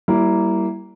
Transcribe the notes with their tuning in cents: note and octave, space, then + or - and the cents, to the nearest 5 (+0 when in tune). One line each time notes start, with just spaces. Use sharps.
G3 -25 A#3 +0 E4 +0